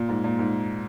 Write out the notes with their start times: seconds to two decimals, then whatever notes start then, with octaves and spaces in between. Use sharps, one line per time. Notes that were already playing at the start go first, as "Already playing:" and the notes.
Already playing: A#2
0.09 G#2
0.24 A#2
0.39 G#2